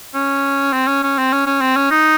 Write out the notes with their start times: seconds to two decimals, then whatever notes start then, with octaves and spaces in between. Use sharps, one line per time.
0.14 C#4
0.73 C4
0.88 C#4
1.03 C#4
1.18 C4
1.33 C#4
1.46 C#4
1.61 C4
1.76 C#4
1.91 D#4